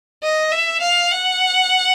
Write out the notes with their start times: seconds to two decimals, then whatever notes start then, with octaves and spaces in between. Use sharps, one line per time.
0.23 D#5
0.52 E5
0.81 F5
1.11 F#5